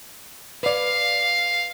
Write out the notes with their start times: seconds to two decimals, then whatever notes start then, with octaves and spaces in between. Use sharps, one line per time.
0.63 B4 D5 F5